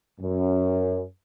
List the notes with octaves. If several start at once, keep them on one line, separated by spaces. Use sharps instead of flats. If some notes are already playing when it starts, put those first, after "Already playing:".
F#2